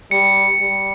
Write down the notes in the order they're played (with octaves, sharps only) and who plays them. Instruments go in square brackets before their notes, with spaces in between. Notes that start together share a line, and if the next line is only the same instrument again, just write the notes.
[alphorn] G3 [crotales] C#7
[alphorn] G3